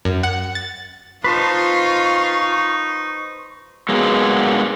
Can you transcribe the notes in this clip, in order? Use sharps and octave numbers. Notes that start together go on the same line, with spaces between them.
F#2
F#5
A6
D#4 F4 B4 C5 A5 C#6
F#3 G#3 A#3 B3